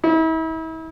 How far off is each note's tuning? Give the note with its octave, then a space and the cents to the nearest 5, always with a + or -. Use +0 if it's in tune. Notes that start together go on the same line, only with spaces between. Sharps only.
E4 -40